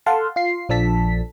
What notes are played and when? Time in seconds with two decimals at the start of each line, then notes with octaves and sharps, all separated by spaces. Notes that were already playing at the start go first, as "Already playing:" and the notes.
0.06 A4 F5 F#5 A5 C6
0.36 F4 C7
0.69 A#1 F3 D4 A4 A5 B6